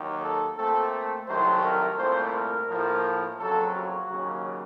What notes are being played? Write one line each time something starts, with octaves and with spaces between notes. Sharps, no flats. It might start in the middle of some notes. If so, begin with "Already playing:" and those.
Already playing: D#2 D#3 F#3
A4
A#2 A3 C4 A4
C2 C3 D#3 F#3 A3 C5
A#4
C2 A#2 A3 C4 C5
A#4
A2 F3 A#3
F2 C#3 F#3 A#3 A4
F#4
D#2 C#3 F#3